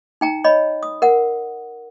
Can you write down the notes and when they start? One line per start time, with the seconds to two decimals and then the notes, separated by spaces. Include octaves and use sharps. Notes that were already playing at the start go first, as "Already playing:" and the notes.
0.21 D#4 G5 A#5
0.44 C#5 D#5 B5
0.83 D#6
1.02 A#4 F#5